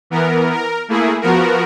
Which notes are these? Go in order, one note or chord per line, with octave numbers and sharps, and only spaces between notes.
E3 B3 A#4
A#4
A3 A#3 E4 G#4
F3 B3 F#4 A#4